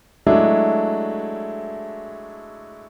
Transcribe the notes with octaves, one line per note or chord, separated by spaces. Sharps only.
F#3 G#3 A3 D4 E4